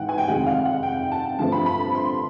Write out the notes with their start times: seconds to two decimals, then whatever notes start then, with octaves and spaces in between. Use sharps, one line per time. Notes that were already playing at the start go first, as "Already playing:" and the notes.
Already playing: G#2 E3 F#5 G5
0.09 G#5
0.18 G5
0.28 F2 C3 D#3 G#3 F#5
0.47 F5
0.65 F#5
0.83 G5
1.12 A5
1.39 G2 D3 F3 A3 C4 A5
1.52 B5
1.66 B5
1.95 C6